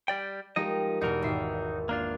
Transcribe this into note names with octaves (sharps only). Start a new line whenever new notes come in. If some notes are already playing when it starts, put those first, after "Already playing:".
G3 D5 G5
F3 G#3 D#4 G4 A#4 D#5
E2 B2 D#4 F#4 A#4
G#1 E5 C7
A#3 D4 F4